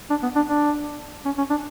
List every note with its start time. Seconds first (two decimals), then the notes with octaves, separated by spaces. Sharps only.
0.10 D4
0.23 B3
0.35 D4
0.48 D4
1.25 C#4
1.38 C#4
1.50 D4